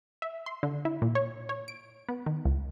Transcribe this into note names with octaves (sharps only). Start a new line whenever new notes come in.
E5
C6
D3
E4
A#2
C#5
C#5
D7
B3
D#3
C#2